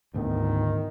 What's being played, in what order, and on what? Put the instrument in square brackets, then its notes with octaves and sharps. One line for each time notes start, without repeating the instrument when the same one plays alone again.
[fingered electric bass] D2 G#2 B3 [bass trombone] D#3